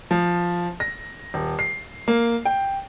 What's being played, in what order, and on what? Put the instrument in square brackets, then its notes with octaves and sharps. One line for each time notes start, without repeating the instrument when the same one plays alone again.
[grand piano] F3
A#6
D#1
C7
A#3
G5